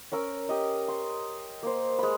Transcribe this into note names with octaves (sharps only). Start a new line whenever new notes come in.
C#4 A#4 E6
G4 D#5
C6
A#3 C5
G#3 B5